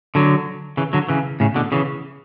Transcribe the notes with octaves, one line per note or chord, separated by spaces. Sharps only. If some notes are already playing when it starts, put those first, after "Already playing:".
D3 F#3
C#3 E3
D3 F#3
C#3 E3
A2 C#3
B2 D3
C#3 E3